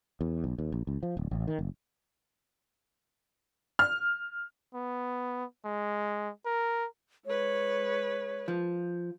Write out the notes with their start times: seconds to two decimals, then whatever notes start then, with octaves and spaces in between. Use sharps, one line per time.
0.21 E2
0.44 B1
0.59 D#2
0.72 A#1
0.87 C#2
1.03 F3
1.17 D1
1.31 A1
1.47 D#3
1.59 F#1
3.79 F6
4.74 B3
5.65 G#3
6.45 A#4
7.26 G#3 B4 C#5
8.48 F3